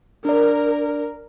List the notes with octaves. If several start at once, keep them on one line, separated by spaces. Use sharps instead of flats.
D4 A#4 D5